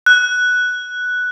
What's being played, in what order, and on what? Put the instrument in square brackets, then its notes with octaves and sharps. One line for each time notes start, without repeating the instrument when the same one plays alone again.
[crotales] F#6